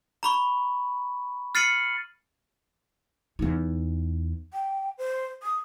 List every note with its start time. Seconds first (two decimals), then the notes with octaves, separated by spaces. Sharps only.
0.23 A#5 B5 C#6
1.55 F6 A6 C7 C#7 D#7 F#7
3.39 E2 D#4
4.53 G5
4.98 C5
5.43 D#6